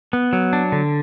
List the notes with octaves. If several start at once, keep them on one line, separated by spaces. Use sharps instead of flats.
B3
F#3
D4
D3